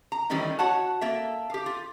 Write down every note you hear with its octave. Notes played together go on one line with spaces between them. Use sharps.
A#5
D#3 E3 G3 A3 C#4 D#4
F#4 C#5 F#5 A5
A#3 A4 E5
G4 F5
F4